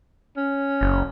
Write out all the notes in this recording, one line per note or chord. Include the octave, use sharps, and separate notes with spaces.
C#4
F#1